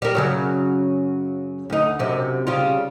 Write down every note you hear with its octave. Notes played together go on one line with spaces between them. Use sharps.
G3 A#4
F#2 C#3 F#3
D2 D#4
F#2 C3
C#3 G3 F4